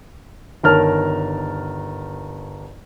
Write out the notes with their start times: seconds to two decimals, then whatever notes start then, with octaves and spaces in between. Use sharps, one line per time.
0.63 G1 D#3 A#4 C#5 A5 F6